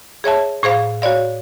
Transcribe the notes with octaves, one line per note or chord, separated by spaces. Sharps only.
G#4 C#5 E5 A5
A2 G#4 C5 F5
F#4 C#5 D5 F5